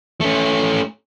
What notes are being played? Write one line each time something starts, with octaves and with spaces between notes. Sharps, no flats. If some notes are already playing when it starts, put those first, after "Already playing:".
A3 C#4